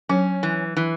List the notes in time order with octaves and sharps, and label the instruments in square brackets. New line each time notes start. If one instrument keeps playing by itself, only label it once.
[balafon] F#3 [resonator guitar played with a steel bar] C#4
[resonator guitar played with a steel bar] E3
E3